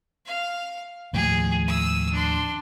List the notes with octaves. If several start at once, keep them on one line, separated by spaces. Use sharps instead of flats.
F5
D#2 A2 F3 G#4
D#6 E6
D4 C6